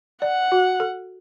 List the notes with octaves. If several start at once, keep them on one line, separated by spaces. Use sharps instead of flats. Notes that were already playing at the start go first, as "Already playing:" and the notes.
D5 F#5
F#4
A4